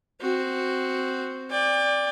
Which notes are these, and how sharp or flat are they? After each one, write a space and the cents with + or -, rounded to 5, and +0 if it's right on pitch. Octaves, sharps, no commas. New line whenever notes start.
C4 +0 F#4 +0
D5 +0 G5 +35